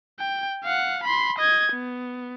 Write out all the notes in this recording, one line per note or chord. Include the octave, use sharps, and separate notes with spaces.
G5
F5 F#5
B5 C6
D#5 G#6
B3